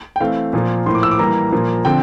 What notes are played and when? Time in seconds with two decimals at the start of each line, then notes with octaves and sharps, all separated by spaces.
0.16 G5
0.20 E3 A3 C4 F5
0.53 A#2 F3 A#3
0.86 A2 F3 A#3 C6
0.95 D6
1.03 E6
1.11 D6
1.19 E3 G3 A#3 A#5
1.52 A#2 F3 A#3
1.85 D3 F3 C4 G5